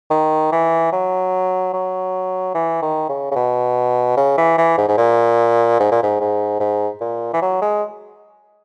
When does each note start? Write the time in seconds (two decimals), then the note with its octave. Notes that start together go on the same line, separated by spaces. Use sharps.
0.10 D#3
0.52 E3
0.92 F#3
1.73 F#3
2.55 E3
2.82 D#3
3.09 C#3
3.31 C#3
3.35 B2
4.17 C#3
4.37 E3
4.58 E3
4.78 G#2
4.88 G#2
4.97 A#2
5.80 G#2
5.92 A#2
6.03 G#2
6.20 G#2
6.60 G#2
7.01 A#2
7.34 E3
7.42 F#3
7.62 G#3